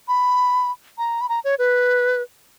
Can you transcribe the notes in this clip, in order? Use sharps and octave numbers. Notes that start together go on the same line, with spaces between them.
B5
A#5
B5
A#5
C#5
B4